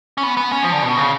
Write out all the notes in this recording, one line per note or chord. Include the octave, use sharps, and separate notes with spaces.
C#4
B3
B3
C#4
F3
D3
B2
C#3